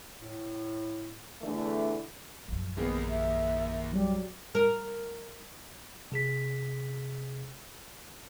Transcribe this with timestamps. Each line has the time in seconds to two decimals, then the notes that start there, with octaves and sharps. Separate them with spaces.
0.20 A2
1.42 E2 D3 A3
2.48 A#1 F#2
2.77 D#2 A#3 B3 D#4 G#4
3.10 E5
3.92 F#3 G3 D5
4.55 A#4
6.12 C3 G#4 B6